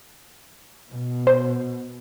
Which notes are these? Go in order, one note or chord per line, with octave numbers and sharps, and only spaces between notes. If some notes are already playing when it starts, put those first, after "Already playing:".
B2
C5